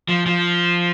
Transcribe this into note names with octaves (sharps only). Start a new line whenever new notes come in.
F3
F3